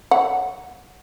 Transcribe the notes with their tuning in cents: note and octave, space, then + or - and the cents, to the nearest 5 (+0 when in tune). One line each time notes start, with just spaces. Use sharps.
C#5 +0 F#5 +0